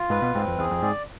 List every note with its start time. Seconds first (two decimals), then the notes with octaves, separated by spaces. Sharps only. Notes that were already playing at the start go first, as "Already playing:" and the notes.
Already playing: F4
0.10 G#2 B4
0.22 B2
0.34 G#2 C4
0.47 F2
0.58 E2 G#4
0.71 F2
0.83 G#2 D5